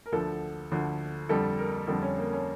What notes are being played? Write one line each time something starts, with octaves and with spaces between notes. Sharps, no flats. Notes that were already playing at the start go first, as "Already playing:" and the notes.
A#4
D2 D3 F3 A4
D2 D3 F3
F2 D3 G3 A4
A#4
F2 D3 G3 A4
C#4
A#3
C#4